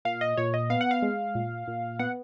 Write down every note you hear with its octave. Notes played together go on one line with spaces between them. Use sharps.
A#2 F5
D#5
A#2 C#5
D#5
B3 F5
F#5
F5
G#3
A#2
A#2
B3 F#5